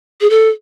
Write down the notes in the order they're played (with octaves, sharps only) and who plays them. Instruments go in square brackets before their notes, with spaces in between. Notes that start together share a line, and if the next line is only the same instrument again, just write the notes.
[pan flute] G#4
A4